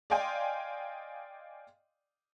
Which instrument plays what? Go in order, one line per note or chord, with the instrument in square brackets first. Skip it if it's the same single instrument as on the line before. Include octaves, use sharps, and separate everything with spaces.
[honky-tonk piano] D5 D#5 F5 G5 G#5 C6